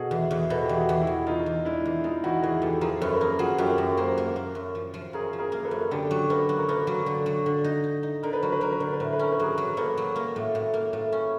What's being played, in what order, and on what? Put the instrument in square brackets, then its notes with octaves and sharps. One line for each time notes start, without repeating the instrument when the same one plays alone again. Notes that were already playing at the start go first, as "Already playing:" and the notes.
Already playing: [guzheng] B2 [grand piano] F#4 G#4 A4
[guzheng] E2
E2
[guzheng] B2 [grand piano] A4 B4
[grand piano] G4
[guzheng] E2
[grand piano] F#4 G#4
[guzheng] E2
[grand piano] E4 F#4
[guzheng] E2
[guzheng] E2 [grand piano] D#4 F4
[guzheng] E2
[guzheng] G#3 [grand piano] D4 E4
[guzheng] E2
[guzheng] G#3 [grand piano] D#4 F4
[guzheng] E2 [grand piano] E4 F#4
[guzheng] E2 [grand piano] F#4 G#4
[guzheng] E2 [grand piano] G4 A4
[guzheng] F3 [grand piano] G#4 A#4
[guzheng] F#2 [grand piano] A4 B4
[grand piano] B4
[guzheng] A#3 [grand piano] G#4 A#4
[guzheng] F3 [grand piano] F#4 G#4
[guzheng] F#2 [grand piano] F4 G4
[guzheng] F#2
[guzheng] A#3 [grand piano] A#4 C5
[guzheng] A#3
A#3
F#2
F3
F3
[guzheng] F#2 [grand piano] G#4 A#4
[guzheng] F3
[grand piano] G#4 A#4
[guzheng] A#3
[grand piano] A4 B4
[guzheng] F#2
[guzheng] D3 [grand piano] G4 A4
[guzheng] F#3
[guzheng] A#3 [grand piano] A4 B4
[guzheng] F#3
[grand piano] A#4
[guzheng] A#3 [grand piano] A4 B4
[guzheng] F#3
D3
F#3
D3
D#4
D#4
D#4
[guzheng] D3 [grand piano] A#4
[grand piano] B4
[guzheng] F#3 [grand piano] A#4
[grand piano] B4
[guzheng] F#3 [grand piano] A#4
[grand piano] B4
[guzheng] D3 [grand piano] A#4
[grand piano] B4
[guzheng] A2 [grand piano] A#4
[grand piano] B4
[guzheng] C#4 [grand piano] A#4
[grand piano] B4
[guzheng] F#3 [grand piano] G#4 A#4
[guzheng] F#3
[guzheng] A#3 [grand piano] A4 B4
[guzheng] F#3
A#3
A2
A2
A#3
A2
C#4